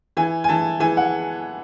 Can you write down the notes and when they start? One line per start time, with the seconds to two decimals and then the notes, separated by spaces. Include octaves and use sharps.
0.17 E3 G#5
0.44 G#5
0.49 E3 A5
0.80 E3 G#5
0.97 F#5